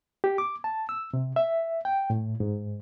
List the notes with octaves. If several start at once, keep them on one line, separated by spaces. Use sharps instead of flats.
G4
D6
A5
E6
C3
E5
G5
A2
G#2